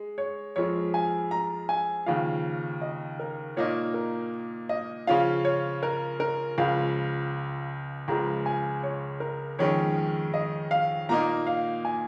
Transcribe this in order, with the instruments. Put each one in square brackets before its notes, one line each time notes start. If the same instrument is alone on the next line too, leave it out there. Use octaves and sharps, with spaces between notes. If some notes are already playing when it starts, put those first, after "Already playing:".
Already playing: [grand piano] G#3
[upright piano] C#5
[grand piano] F2 F3 G#3 [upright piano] C#5
[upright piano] G#5
A#5
G#5
[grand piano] D#2 C#3 F3 [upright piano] F5
[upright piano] D#5
A#4
[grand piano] A#2 A#3 D#4 [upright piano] C#5
[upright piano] A#4
D#5
[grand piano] C#3 F3 C#4 F4 [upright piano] F5
[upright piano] C#5
A#4
A#4
[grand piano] C#2 C#3 F3 [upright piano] F5
[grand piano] C#2 C#3 F3 G#3 [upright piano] A#5
[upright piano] G#5
C#5
A#4
[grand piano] F2 D#3 G#3 C#4 [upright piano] C#5
[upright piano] D#5
F5
[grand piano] A#2 A#3 D#4 [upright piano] A#5
[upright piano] F5
G#5